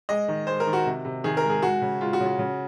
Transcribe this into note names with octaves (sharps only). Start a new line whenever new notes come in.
G#3 D#5
D#3
G#3 C5
A#4
D#3
F#4
C3
C3
D#3 G#4
A#4
G#3
G#4
G#3 F#4
C#3
G#3 F4
F#4
C#3
F#4
C#3